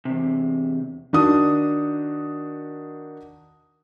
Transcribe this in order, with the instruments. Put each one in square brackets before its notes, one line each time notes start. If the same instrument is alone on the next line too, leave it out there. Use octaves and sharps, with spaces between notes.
[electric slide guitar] E2 C3
[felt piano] D#3 D4 F#4 D#6